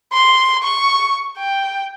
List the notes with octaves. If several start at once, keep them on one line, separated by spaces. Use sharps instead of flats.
C6
C#6
G5